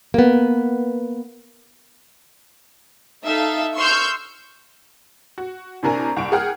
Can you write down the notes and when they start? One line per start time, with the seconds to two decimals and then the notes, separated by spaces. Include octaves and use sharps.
0.14 A#3 B3
3.23 D#4 A4 E5 F5
3.75 C6 C#6 E6 F6 G6
5.38 F#4
5.83 A2 C3 D4 A#4 G#5 A#5
6.16 C2 C#6 D7
6.32 G#4 A#4 F#5 G5 F6